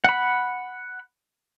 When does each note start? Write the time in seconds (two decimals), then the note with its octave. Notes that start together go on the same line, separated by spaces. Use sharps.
0.04 F#5 B5